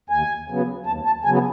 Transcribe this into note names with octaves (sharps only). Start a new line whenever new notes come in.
D#2 G#5
C#3 F#3 B3
D#2 A5
A5
C#3 F#3 B3 G#5